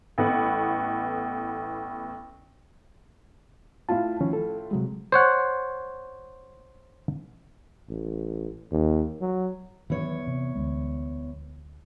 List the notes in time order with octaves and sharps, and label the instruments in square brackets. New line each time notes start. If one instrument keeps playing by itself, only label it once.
[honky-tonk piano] A1 A2 A3 B3 F#5
[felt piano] A2 E4 F4 [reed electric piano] F5 A5
[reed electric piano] D#3 F3 C#4
A4
C3 F#3 G#3
[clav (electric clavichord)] C5 C#5 F#5
[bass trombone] A1
D#2
F#3
[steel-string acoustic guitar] E2 C#5 [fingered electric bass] D#3 F#3
[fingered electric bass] C3
D2 G#3